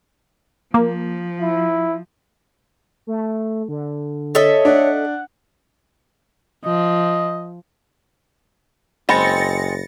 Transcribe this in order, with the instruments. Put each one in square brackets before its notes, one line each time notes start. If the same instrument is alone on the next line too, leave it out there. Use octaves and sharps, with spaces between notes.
[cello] F3 [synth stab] A#3
[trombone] E4
[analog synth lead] A3
D3
[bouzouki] A4 D#5 E5 [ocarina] C#5
[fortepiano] D4 [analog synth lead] F#5
[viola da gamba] F3 [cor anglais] D#5
[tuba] F#1 [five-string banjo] G#3 C4 [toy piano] B5 [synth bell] A6 A#6 C#7